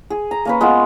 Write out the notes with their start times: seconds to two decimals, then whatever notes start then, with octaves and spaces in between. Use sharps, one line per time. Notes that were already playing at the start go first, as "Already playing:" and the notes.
0.10 G#4
0.31 A#5
0.45 A#3 C#4 B4
0.61 G#3 B3 F4 A#4